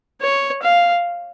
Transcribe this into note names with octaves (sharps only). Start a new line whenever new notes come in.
C#5
F5